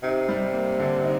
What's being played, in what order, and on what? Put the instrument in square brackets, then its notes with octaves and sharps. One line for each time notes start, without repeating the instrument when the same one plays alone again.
[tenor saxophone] C3 [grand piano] D#4
[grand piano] G3
A#3
D3
D#4